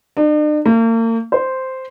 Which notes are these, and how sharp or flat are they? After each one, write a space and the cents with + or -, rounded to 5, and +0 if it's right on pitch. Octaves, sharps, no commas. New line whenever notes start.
D4 +45
A#3 -40
C5 -5